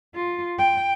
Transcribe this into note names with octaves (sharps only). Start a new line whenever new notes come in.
F4
G5